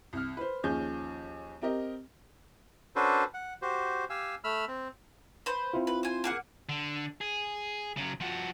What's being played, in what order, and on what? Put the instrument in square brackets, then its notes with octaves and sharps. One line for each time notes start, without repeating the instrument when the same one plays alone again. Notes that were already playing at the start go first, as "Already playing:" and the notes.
[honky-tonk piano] C2 F6
B4 C5
D#2 F3 C#4 G#4 G6
C4 G4 A#4 D#5
[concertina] C#4 D4 F#4 A4 B4 C5
F#5
F#4 G4 C5
G4 F5 G#5 E6
A3 B5 E6 F6
C4
[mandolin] B4 C5
[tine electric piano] C4 E4 F4
[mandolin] B4
C5 G#5
A#3 G#4 F#5
[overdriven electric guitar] D3
G#4
C#3 F#3
F3 F#4